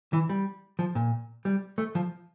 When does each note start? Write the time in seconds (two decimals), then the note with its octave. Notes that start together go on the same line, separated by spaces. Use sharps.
0.13 E3
0.29 G3
0.79 F3
0.95 A#2
1.45 G3
1.78 A3
1.95 F3